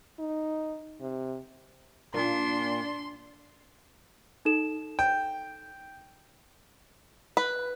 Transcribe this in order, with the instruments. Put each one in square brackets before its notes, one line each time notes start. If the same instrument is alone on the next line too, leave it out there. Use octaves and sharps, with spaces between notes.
[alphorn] D#4
C3
[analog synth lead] A#2 [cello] D4 [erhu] C6
[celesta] D#4 A4 E7
[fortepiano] G5
[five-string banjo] B4